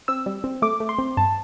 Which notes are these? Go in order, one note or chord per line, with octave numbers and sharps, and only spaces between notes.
C4 E6
G3
C4
A3 D6
A3
C6
C4
G2 A5